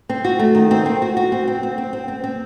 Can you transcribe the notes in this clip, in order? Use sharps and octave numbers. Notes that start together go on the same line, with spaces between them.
C4
F#4
A3
D#3
C4
C4
F#4
F#4
C4
C4
C4
C4
C4
C4
C4